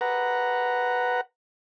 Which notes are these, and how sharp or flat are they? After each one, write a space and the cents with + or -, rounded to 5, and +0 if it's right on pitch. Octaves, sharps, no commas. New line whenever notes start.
B4 +0 F#5 +0 A#5 +0